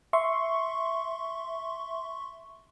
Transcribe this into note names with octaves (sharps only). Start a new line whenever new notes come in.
E5 C6 C#6